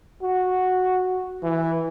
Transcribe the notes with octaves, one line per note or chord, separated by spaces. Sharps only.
F#4
E3